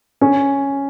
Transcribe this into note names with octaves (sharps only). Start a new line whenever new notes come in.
C#4